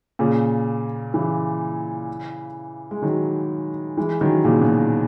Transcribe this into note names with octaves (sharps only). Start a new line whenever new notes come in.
A#2 C#3
C#3 E3
G#3
D#3 F#3
E3 G#3
D#3 F#3
A#2 C#3
B2
A#2